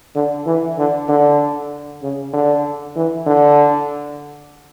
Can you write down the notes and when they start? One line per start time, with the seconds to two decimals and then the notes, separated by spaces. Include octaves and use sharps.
0.15 D3
0.46 E3
0.78 D3
1.08 D3
2.03 C#3
2.33 D3
2.96 E3
3.26 D3